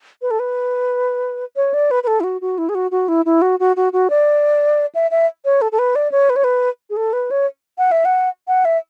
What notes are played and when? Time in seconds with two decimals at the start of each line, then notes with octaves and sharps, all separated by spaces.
0.22 B4
0.31 A4
0.39 B4
1.56 C#5
1.74 D5
1.91 B4
2.03 B4
2.07 A4
2.20 E4
2.24 F#4
2.41 F#4
2.58 E4
2.69 G#4
2.75 F#4
2.91 F#4
3.08 E4
3.25 E4
3.42 F#4
3.60 F#4
3.76 F#4
3.93 F#4
4.10 D5
4.95 E5
5.11 E5
5.45 C#5
5.61 A4
5.72 A4
5.79 B4
5.95 D5
6.12 C#5
6.30 B4
6.36 C#5
6.44 B4
6.90 G#4
6.97 A4
7.13 B4
7.31 C#5
7.78 F#5
7.91 E5
8.05 F#5
8.48 F#5
8.65 E5